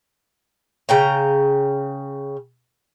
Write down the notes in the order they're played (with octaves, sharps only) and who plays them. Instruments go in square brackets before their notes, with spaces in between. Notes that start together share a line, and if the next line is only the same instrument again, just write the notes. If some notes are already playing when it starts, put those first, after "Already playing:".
[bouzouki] C#3 G5 A#5